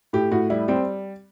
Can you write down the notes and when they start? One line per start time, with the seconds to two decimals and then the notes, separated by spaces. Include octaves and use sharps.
0.13 A2 G4
0.31 A2 F#4
0.50 G3 E4
0.68 G3 C4